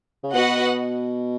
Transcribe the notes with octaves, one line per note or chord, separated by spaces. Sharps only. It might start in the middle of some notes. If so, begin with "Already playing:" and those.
C#3
B2 F#4 B4 D#5 F#5